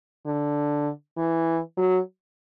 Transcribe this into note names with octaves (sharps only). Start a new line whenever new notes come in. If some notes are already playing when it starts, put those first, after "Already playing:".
D3
E3
F#3